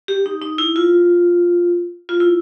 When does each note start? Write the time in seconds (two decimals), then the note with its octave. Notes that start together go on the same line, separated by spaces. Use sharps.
0.08 G4
0.26 D#4
0.42 D#4
0.58 E4
0.76 F4
2.09 F4
2.20 E4